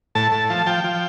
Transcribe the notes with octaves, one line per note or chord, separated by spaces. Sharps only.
A2 A5
A2
F3
F3 G5
F3